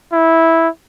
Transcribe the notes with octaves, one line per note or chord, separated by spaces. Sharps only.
E4